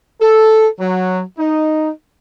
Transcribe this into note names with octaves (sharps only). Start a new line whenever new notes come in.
A4
F#3
D#4